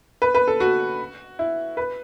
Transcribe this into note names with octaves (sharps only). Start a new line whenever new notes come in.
B4
B4
A4
F#4
E4
B4